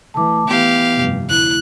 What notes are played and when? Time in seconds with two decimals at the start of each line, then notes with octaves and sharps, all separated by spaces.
0.14 E3 A3 A5 D6
0.48 E3 B3 G4 F5
0.96 F1 G2
1.30 D2 E4 F#6